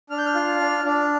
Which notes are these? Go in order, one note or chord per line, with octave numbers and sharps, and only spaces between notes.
D4 F6
G6
F6
F4
D4
D4